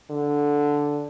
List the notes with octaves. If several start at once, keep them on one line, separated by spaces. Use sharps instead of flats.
D3